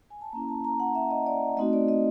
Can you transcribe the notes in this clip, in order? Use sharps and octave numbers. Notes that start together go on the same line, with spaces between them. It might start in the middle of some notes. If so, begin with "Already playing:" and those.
G#5
A5
A#3 C#4 E4 A#5
A5
A#5
F#5
E5
D#5
D5
A3 C4 D#4 F#4 D#5
D5
D#5